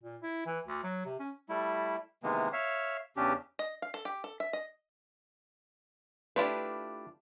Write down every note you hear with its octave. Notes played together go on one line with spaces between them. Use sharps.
A#2
E4
E3
D2
F#3
C3
C#4
G3 A3 E4
C3 D#3 E3 G#3 A#3 B3
C#5 E5 F5
E2 C#3 C#4 D4 G4
D#5
F5
A4
G4
A4
E5
D#5
A3 D4 E4 F4 G4 B4